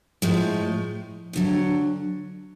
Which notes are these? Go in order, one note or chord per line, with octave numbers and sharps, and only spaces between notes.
A2 F3 G#3
D2 D3 F#3